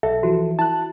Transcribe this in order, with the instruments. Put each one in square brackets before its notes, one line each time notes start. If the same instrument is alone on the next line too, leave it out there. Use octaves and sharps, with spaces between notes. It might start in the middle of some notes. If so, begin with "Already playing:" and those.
[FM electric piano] B1 [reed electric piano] A4 [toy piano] E5
[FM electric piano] E3 F3 [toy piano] F#4
[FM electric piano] E4 F#6 [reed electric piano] A5